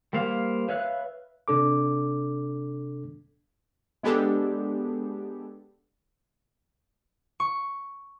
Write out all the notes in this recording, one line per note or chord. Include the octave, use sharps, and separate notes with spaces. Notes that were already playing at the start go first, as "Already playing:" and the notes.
G3 A#3 C5 F5
B4 C#5 E5 F5 F#6
C3 D4 A4 D6
G#3 B3 D4 G4 A4
C#6